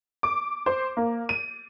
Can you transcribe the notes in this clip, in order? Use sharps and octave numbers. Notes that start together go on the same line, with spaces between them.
D6
C5
A#3
D#7